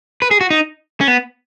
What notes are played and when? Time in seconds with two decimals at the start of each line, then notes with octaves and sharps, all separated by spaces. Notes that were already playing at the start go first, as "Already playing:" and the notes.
0.22 B4
0.31 G#4
0.41 F#4
0.50 D#4
1.01 C#4
1.08 B3